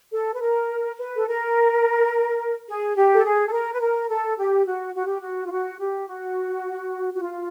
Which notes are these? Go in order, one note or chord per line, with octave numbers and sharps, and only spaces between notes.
A4
B4
A#4
B4
A4
A#4
G#4
G4
A4
G#4
A4
A#4
B4
A#4
A4
G4
F#4
F#4
G4
F#4
F4
F#4
G4
F#4
F#4
F4